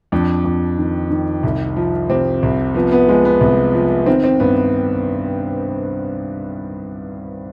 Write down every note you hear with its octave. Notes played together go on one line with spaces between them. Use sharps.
F2 D4
F2
D#3
D#3
C2
F3
C3 C4
C2
F3 B3
B3
F3 G#3
B3
C2
F3
D#3 C4
C4
G2 B3